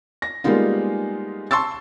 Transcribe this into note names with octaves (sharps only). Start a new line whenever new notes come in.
A#6
G3 G#3 A#3 B3 D#4 F4
A5 C6 C#6 E6 A6